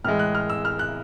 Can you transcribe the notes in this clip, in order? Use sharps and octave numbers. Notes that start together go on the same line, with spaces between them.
A2 E3 G#3 F6
F#6
F6
E6
F6
F#6